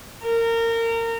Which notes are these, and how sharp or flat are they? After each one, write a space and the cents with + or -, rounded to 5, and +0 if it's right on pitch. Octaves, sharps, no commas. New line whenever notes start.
A#4 -25